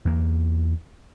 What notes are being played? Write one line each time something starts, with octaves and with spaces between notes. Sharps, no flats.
E2 A#3